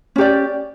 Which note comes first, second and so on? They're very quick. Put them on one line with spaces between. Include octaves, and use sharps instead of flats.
C#4 G4 D5